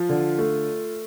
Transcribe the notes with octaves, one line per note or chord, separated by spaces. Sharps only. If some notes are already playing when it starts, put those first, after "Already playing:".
Already playing: F3 F4
D3
A3